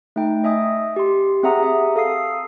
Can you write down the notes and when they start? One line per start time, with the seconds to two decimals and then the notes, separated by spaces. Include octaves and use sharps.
0.16 A3 D#4 G5
0.44 D#5 E5 G#5 D#6
0.96 G4 C6
1.43 C4 G#4 E5 F#5 A#5 D#6
1.59 G4 E5
1.96 A4 F5 D#6 C7